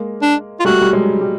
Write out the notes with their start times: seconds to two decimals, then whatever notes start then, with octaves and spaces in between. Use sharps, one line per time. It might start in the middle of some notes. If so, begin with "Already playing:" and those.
Already playing: G#3 A#3
0.22 D4
0.60 F4
0.65 G3 A3 F#4
0.82 G3
0.93 F#3 G#3
1.21 G3